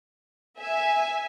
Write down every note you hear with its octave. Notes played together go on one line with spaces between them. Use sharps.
E5 G#5